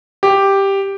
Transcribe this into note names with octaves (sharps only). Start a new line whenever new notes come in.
G4